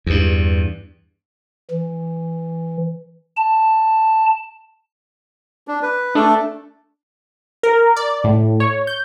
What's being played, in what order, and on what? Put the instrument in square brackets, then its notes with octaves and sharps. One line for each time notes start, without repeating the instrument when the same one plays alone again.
[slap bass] E2 G2
[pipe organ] E3
A5
[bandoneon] D4
B4
[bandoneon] A3 A4 [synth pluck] D4
[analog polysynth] A#4
D5
A2
C#5
G6